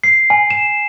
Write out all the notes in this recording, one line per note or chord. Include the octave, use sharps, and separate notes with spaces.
C7
G#5
E7